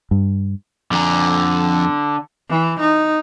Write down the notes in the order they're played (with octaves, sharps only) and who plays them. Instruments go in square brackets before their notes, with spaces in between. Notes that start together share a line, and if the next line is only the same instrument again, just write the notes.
[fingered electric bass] G2
[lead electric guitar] F2 A#5 [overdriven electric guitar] D3
[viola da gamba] E3
D#4